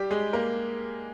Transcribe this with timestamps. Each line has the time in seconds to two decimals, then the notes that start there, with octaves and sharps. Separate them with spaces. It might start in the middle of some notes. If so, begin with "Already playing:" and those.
Already playing: G3 G4
0.11 G#3 G#4
0.33 A#3 A#4